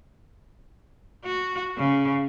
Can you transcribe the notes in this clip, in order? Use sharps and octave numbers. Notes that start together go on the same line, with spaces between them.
F#4
C#3